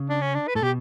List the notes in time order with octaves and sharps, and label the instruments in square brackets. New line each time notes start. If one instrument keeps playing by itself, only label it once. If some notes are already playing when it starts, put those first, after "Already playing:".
Already playing: [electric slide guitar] C#3
[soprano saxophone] D4
C#4
D4
B4
[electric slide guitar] A2 [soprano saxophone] A4
[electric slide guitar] B2 [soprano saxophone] G4